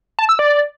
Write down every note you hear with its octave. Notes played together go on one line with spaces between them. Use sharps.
A5
E6
D5